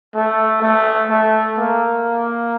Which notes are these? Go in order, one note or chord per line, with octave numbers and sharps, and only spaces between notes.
A3
A3
A3
A#3